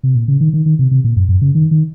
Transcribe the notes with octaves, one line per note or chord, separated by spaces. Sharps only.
C3
A#2
C#3
D#3
D#3
D#3
C3
C3
A#2
F#2
F#2
C#3
D#3
D#3